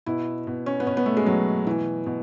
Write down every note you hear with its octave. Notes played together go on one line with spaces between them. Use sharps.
B2 E4
B2
C#4
B3
B2 C#4
B3
A3
G#3
B2 F#3
B2 E3
B2